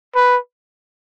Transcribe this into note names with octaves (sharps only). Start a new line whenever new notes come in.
B4